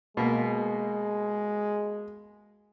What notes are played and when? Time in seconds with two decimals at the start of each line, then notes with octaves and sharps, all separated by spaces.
0.17 B2 G#3 A#3